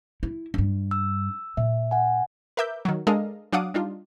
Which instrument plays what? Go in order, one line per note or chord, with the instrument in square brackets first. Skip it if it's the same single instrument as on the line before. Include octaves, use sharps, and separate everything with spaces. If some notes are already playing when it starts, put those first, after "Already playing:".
[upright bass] E4
G2 D4
[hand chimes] E6
[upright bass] A#2 [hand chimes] E5
[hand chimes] F#5 G#5
[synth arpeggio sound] A#4 B4 E5 D6 G6
D#3 F#3
G#3 D4 A4 A#4 D#5 F5
F#3 D4 F5 F#5 D6 D#6
G3 D4 D#4 F4